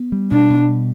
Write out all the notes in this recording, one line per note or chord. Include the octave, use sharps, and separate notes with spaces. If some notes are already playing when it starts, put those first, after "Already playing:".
Already playing: B3
G3
B2 D4
B2
G3